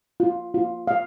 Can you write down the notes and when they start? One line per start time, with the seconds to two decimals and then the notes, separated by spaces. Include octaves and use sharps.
0.20 F4
0.54 F4
0.87 F5